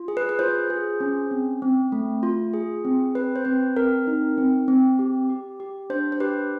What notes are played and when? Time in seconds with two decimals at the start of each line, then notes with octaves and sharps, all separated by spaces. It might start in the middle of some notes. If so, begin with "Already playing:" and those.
Already playing: F4
0.08 G#4
0.17 B4
0.29 B4
0.39 F4 C5
0.70 G#4
1.00 C#4
1.31 C4
1.62 C4
1.92 A3
2.23 F4
2.53 G#4
2.85 C4
3.15 C4 B4
3.36 C5
3.45 C4 B4
3.76 C4 A#4
4.07 D#4
4.38 C4
4.68 C4
4.99 G4
5.30 G4
5.60 G4
5.90 D4 C5
6.12 C5
6.20 G4 B4